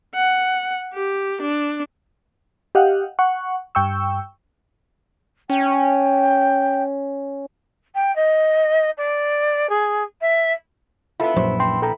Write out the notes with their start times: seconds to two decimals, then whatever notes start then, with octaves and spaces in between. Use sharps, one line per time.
0.15 F#5
0.93 G4
1.42 D4
2.75 G4 D#5 F5 F#5
3.19 F#5 C#6
3.75 G2 G5 C#6 E6
5.50 C#4 G5
7.95 G5
8.15 D#5
8.97 D5
9.69 G#4
10.21 E5
11.20 B3 E4 F4 A4
11.36 A#1 F#2 F#3 C5
11.60 G5 C6
11.82 A4 G5 A#5